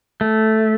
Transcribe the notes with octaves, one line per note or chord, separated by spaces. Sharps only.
A3